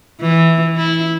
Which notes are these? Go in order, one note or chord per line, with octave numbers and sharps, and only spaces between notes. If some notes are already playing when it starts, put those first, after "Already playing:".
E3
E4